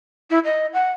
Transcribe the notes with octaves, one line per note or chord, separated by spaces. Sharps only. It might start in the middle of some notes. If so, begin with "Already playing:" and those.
E4
D#5
F#5